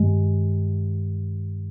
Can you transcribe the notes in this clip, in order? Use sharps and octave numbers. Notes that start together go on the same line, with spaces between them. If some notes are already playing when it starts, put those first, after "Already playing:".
Already playing: G2 D#3 G#3